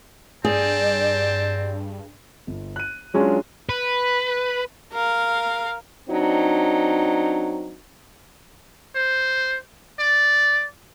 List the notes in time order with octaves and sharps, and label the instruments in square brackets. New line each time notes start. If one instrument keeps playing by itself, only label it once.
[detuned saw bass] G2 [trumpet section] C4 G5 A5 [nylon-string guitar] G#4 [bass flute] D5
[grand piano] G1
F#6 D#7
F#3 G#3 C#4 D4 F4
[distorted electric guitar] B4
[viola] A#4 F5
[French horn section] F#3 C4 D4 D#4
[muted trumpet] C5
D5